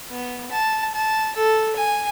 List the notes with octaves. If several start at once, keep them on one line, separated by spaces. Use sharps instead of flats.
B3
A5
A5
A4
G#5